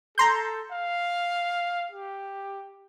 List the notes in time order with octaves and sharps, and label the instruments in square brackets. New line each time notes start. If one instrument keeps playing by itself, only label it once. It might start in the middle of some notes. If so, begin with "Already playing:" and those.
[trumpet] A4 [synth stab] A#5 C6 G6
[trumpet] F5
G4